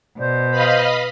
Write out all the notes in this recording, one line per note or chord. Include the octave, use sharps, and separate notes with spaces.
B2 C5 D5
B4 D#5 F5 B5